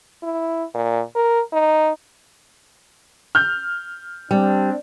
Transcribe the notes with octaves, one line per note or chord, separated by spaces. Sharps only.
E4
A#2
A#4
D#4
F6 G6
G3 C4 D4